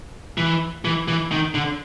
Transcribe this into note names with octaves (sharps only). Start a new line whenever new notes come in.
E3
E3
E3
D#3
D3